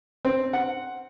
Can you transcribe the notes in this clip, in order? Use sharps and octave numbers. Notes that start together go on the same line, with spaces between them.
C4
F#5